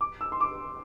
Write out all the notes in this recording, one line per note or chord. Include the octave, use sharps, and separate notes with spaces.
D6
E6
C6
D6